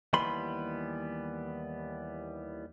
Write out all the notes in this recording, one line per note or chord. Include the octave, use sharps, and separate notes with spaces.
D#2 E3 G3 B3 B5 C6